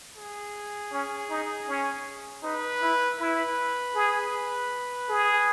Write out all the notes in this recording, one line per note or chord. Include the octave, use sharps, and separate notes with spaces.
G#4
C#4
D#4
C#4
D#4 B4
E4
E4 B4
G#4
G#4